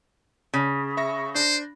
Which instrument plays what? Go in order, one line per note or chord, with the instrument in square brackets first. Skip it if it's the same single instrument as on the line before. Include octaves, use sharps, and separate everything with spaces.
[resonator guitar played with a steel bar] C#3
[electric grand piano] E5 C#6 A#6
[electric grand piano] D4 [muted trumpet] C5